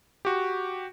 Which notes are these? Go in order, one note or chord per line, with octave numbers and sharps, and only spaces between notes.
F#4 G4